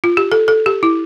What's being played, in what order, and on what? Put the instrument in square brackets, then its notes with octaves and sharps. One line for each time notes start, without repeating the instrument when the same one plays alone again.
[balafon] F4
G4
A4
A4
G4
E4